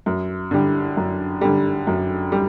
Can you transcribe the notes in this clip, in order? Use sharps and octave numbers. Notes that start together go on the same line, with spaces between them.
F#2
D3 G3
F#2
D3 G3
F#2
G3